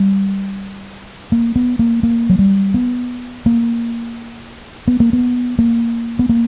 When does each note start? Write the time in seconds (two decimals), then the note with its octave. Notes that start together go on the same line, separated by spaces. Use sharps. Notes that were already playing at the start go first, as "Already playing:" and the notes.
Already playing: G3
1.32 A#3
1.56 B3
1.79 A#3
2.03 A#3
2.30 F#3
2.39 G3
2.74 B3
3.46 A#3
4.88 B3
5.00 A#3
5.13 B3
5.59 A#3
6.19 B3
6.29 A#3